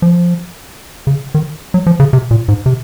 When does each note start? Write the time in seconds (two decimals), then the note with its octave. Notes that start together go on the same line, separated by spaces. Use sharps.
0.02 F3
1.07 C#3
1.34 D#3
1.74 F#3
1.86 F3
2.00 C#3
2.13 C3
2.31 A#2
2.48 G#2
2.66 C3